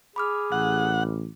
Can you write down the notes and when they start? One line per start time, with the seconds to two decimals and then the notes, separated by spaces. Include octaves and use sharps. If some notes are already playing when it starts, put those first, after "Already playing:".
0.16 G#4 B5 D6 F6
0.52 A1 F#5